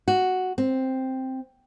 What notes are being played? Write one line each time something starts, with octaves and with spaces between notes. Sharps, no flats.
F#4
C4